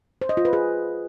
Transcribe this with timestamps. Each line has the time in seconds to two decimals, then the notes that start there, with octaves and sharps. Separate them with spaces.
0.21 C5
0.29 D#5
0.37 F4
0.45 B4
0.53 G#4